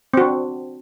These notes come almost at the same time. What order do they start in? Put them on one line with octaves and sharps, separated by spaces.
C4 F#4 D4